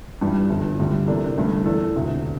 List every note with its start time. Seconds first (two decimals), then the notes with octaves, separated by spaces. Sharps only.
0.21 G2 E3 G3 D4
0.50 G1 G2 E3
0.79 D2 D3 G3
1.07 C3 E3 A#3 D4 A4
1.37 G1 G2 E3 A3
1.65 E2 E3 A3 D4 A4
1.95 E1 D2 C3